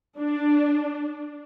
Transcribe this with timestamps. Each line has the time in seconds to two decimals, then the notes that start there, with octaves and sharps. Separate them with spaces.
0.18 D4